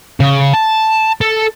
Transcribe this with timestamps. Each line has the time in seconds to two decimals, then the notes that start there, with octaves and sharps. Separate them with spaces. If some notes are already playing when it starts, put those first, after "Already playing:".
0.20 C#3
0.54 A5
1.21 A4